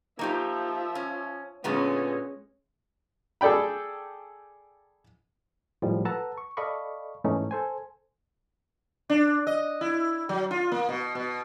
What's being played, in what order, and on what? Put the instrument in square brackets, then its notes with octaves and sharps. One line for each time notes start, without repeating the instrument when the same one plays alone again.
[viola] F3 E5 [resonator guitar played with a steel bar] A#3 D#4 G4
[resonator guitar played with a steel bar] C#4
[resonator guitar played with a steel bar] A#2 D3 B3 [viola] G#3 C#4
[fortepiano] G#4 A4 D5 G5 B5
[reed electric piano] A2 D#3 F3 G3 G#3
A4 B4 F#5 A5 A#5 E6
C#6
A4 D5 D#5 F5 B5 C#6
G#2 E3 G#3 A3 C#4 D#4
A4 C5 G#5
[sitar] D4
D#5
E4
F#3
F4
A#3
B2
B2